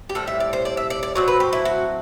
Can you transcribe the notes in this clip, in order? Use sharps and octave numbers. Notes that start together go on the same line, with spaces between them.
G4
A2 G3 C4 A4
E5
D5
C5
D5
E5
D5
D5
A2 F#3 C4 D5
B4
G4
E4
F#4